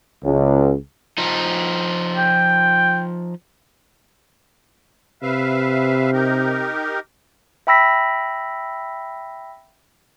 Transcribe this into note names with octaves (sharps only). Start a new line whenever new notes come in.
C#2
F3 D#4
G5
C3 B4 E5 F5
D#4 G4 A#4
E5 G5 B5 E6 A#6 B6